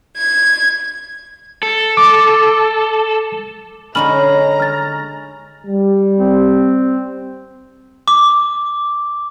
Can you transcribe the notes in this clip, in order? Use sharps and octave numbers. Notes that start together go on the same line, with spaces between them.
G#6
A4
D6
D3 G#3 C#4 D#4 A#5 B5 F6 F#7
F6 A6
G3
C4
D6